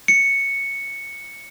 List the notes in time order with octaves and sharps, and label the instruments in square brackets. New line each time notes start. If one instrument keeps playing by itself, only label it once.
[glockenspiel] C#7